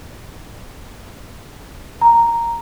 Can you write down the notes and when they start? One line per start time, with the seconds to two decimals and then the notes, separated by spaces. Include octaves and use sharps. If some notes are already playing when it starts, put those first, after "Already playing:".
2.01 A#5